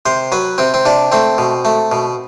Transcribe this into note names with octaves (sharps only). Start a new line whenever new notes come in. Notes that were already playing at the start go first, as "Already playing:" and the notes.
C3 C5
F#3 B4
C3 C4
C4
C3 D4
A3 C4
B2
A3
B2